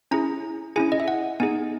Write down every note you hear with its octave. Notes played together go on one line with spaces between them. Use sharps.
C#4 E4 G#4 A#5
C#4 E4 G#4 G#5
D#5
E5
F#5
B3 D#4 G#4 G#5